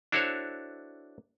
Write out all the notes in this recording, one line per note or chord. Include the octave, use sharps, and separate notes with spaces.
D4 E4 F#4 A4 C5 C#5